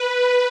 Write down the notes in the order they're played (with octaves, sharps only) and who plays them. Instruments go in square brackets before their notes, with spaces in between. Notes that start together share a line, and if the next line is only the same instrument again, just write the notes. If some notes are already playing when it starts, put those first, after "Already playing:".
Already playing: [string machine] B4